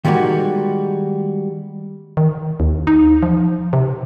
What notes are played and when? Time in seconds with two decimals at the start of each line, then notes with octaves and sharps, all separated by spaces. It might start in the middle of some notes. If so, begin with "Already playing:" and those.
0.05 D#3 G3 G#3 A#3 F#4
2.17 D#3
2.60 D#2
2.87 D#4
3.23 F3
3.73 C3